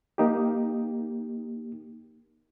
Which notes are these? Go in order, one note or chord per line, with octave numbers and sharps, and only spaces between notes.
A#3 D#4 G4